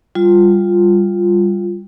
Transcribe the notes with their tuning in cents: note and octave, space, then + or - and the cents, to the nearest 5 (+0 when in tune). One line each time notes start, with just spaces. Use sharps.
G3 +10 F4 +0